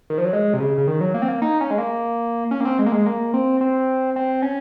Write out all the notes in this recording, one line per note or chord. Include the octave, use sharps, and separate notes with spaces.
D#3
F3
F#3
G#3
C3
C#3
C#3
D#3
F#3
A#3
C4
A#3
D#4
C#4
G#3
A#3
C#4
A#3
C4
G#3
A#3
G#3
A#3
C4
C4
C4
C#4